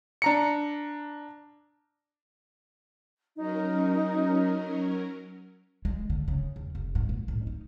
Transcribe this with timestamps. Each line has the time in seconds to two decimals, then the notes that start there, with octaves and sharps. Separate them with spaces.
0.22 D4 A#5 C#7
3.36 F#3 C#4 D#4 A#4
5.85 G#3
6.10 D3
6.28 C#3
6.56 E2
6.75 F1
6.95 G#2
7.09 A#2
7.28 A2
7.47 D#4